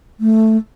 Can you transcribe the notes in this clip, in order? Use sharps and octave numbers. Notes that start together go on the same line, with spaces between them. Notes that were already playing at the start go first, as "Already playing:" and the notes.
A3